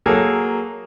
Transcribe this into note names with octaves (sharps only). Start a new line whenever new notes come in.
F#3 A#3 G#4 A4